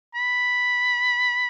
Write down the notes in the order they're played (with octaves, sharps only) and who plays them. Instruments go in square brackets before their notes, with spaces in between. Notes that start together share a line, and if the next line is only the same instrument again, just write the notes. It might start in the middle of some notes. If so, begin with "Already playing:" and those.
[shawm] B5